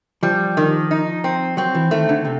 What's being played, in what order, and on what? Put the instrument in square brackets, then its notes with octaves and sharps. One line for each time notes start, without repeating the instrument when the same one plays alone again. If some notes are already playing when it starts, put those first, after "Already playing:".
[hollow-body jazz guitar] F3 [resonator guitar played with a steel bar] G3
[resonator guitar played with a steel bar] D#3
D#4
C4
[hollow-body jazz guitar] F#3 [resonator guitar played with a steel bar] C4
[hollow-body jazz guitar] E3
[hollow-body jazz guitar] D#3 [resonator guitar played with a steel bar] A3
[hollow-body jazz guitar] D3
C3